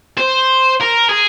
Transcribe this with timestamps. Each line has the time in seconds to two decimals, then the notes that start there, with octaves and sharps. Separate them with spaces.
0.18 C5
0.81 A#4
1.09 G#4